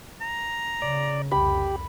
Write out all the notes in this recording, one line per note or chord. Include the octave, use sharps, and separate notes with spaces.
A#5
C#3 D5
C2 F2 G4 B5